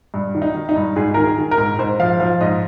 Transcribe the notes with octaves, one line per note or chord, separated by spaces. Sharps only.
G2
D#3
D#4
D#3
D#4
G2
G#2 G#4
D#3 A#4
G#4
D#3
A#4
G#2
G#2 C5
F3 F5
F3 F5
G#2 D#5